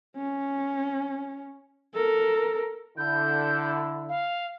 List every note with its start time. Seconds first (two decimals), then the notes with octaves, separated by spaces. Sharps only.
0.17 C#4
1.94 A4 A#4
2.97 D3 E4 G6
4.08 F5